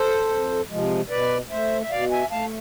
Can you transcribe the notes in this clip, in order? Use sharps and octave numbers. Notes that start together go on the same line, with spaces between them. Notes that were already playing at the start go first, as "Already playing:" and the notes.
Already playing: A4 C5
F2
C3 F3 G#3
B2 B4 D5
A3 C5 E5
E5
B2 D5 F5
E5 G#5
A3 F5 A5